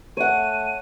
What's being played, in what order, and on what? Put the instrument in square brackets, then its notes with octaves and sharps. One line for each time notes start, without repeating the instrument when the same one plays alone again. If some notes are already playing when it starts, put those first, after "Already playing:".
[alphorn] A3 [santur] C#5 F#5 [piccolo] D#7